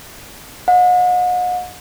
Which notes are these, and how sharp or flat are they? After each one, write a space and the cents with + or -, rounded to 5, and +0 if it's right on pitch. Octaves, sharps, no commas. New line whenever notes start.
D#5 -15 F#5 -40